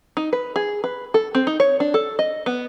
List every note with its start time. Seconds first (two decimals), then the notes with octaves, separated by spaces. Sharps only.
0.17 D#4
0.33 B4
0.56 G#4
0.84 B4
1.14 A4
1.35 C4
1.47 D#4
1.60 C#5
1.80 D4
1.94 A4
2.19 D#5
2.46 B3